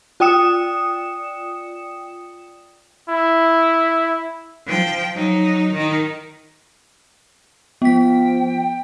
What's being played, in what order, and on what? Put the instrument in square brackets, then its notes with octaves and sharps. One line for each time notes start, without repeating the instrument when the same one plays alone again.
[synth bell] F4 D5 G5 D#6 C#7 E7
[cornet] E4
[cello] F3 G5
F#3 D#4
D#3 D#4
[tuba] F3 [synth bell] B3 B6 [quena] G5